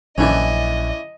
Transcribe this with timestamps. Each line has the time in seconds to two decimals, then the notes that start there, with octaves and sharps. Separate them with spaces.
0.18 A#1 F#2 D3 E3 C#4 E4 D5 D#5